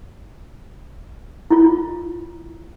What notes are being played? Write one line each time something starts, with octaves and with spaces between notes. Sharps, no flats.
E4 F4